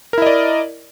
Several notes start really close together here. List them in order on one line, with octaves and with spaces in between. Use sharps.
A#4 E4 D#5 D5